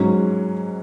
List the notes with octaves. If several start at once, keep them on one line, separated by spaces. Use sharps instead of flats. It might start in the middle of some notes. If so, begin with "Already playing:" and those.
Already playing: G#2 F#3 C#4